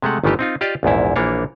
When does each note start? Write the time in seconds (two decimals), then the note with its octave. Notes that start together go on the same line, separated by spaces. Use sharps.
0.02 C3 G#3 A3 F#5
0.24 G1 D#3 E3 A3 G4 D#5
0.39 C4 D#4 F4
0.61 F4 G4 D5 D#5 F5
0.83 A#1 E2 G#2 E4
1.16 A#1 E3 A#3 D4 C#5